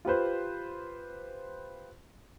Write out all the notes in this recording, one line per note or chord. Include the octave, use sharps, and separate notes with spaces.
F4 G4 B4 C5